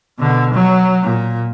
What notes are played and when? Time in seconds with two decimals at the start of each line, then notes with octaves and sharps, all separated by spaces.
0.19 B2 D3
0.53 F#3
1.02 A#2